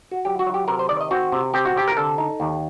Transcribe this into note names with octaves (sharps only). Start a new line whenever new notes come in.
F#4
F#3 G4
F#4
F#3
G4
C3 A#4
C5
D#3 D5
D#5
C4 F#4
C3
C4 G4
F#4
C3 G4
A#4
D3 A4
D#4
D#2